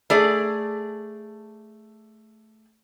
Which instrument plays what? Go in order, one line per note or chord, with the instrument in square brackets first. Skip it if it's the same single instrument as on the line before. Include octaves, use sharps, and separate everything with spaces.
[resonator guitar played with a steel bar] A3 G#4 D5